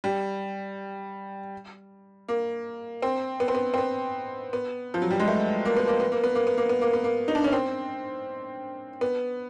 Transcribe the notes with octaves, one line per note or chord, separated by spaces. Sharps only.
G3
A#3
C4
B3
C4
B3
C4
B3
B3
F3
F#3
G3
G#3
A3
A#3
B3
A#3
B3
A#3
B3
A#3
B3
A#3
B3
A#3
B3
A#3
D#4
D4
C#4
C4
B3